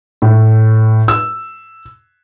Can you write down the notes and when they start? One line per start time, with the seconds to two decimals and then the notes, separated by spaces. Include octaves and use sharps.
0.22 A2
1.08 E6